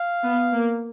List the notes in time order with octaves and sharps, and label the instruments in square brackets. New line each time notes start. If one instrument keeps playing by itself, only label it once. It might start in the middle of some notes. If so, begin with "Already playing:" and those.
Already playing: [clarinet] F5
[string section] B3
A#3